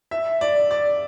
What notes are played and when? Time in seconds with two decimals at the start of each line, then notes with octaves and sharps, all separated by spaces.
0.11 E5
0.41 D5
0.71 D5